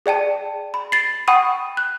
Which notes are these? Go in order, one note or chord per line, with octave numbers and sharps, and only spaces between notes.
G#4 D5 G5 A5
B5
A6 C7
F#5 G5 B5 C#6 D#6 D#7
F#6